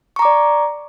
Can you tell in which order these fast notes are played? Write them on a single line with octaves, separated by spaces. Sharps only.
C#6 A#5 D6 D5